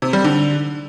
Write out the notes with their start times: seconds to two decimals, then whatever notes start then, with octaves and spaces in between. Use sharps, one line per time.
0.02 C3
0.13 G3
0.24 D3